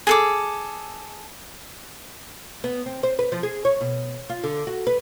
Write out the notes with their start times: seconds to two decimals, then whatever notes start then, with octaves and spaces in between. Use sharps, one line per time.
0.07 G#4 A4 D6
2.64 B3
2.86 C4
3.03 C5
3.19 B4
3.32 F3
3.43 G#4
3.65 C#5
3.81 B2
4.30 F4
4.44 D3
4.67 F#4
4.87 B4